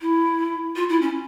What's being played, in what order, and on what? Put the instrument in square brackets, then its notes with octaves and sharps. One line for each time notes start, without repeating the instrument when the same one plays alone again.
[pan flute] E4
F4
E4
C#4